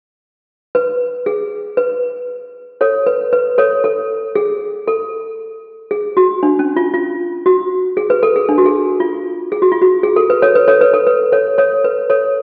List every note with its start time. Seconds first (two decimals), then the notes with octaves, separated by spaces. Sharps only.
0.75 B4
1.26 G#4
1.77 B4
2.81 A4 C#5
3.06 B4
3.33 B4
3.58 A4 C#5
3.84 A4
4.35 G#4
4.88 A4
5.91 G#4
6.17 F#4
6.43 D4
6.59 C#4
6.76 F4
6.94 F4
7.46 F#4
7.97 G#4
8.10 B4
8.23 A4
8.36 G#4
8.49 D4
8.58 F#4
8.66 G#4
9.00 F4
9.52 G#4
9.62 F#4
9.72 F4
9.82 F#4
10.03 G#4
10.16 A4
10.30 B4
10.42 A4 C#5
10.55 B4
10.68 A4 C#5
10.81 B4
10.94 A4
11.07 B4
11.32 A4 C#5
11.58 A4 C#5
11.84 B4
12.10 A4 C#5